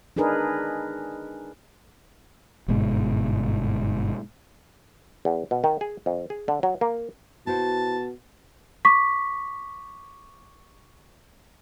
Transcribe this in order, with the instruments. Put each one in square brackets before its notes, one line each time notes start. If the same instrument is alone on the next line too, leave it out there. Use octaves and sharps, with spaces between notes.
[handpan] D4 D#4 G#4 A#4 B4
[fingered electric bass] G1 G#2 B2 G#3
[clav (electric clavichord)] E2
B2
D#3
G#4
F2
G#4
D3
F#3
A#3
[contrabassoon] B2 [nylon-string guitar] E4 F#4 C5 [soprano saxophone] A5
[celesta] C#6 D6 B6